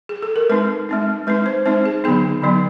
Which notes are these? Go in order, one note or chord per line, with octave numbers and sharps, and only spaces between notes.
G#4
A4
A#4
G#3 C4 D#4 B4
G#3 C4 D#4
G#3 C4 D#4 B4
C5
G#3 C4 D#4 C5
G#4
D3 F#3 B3 D#4 G#4
D3 F#3 B3 D#4